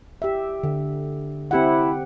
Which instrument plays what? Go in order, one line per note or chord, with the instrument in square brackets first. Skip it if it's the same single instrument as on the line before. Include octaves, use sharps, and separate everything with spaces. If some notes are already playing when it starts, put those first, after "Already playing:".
[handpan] G4 E5
D3
[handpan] C4 G4 F#5 [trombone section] E4